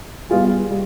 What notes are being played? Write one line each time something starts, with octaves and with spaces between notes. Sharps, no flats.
G3 B3 F4 G#4
G3